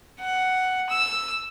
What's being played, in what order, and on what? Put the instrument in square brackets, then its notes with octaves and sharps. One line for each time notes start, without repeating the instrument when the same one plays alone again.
[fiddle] F#5
E6